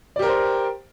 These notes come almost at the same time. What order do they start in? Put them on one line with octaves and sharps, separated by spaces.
D5 G4 A#4 G5 C5